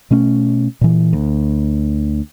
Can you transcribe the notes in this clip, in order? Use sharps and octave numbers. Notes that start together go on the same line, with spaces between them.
B2 A3 C#4
A#2 E3
D2